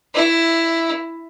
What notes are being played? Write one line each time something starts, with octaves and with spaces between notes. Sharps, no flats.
E4